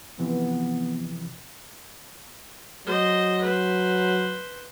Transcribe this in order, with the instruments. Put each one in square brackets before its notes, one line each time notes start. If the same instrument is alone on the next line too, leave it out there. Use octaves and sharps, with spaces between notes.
[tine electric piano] C3 E3 F3 [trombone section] B3
[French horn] F#3 [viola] C5 D#5
[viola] B4 C5